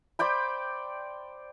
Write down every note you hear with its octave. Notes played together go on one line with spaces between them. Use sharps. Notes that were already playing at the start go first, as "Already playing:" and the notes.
C5 D5 G5 B5